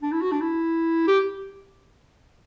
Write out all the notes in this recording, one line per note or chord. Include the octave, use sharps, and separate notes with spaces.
D4
E4
F#4
D4
E4
G4